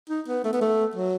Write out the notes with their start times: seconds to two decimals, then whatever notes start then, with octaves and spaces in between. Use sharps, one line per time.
0.09 D#4
0.28 B3
0.44 A3
0.53 B3
0.61 A3
0.95 F#3